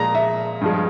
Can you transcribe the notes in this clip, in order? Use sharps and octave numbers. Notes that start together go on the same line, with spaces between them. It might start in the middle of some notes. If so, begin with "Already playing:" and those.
Already playing: A#2 F3 G#3 A#5
E5
G2 F3 G#3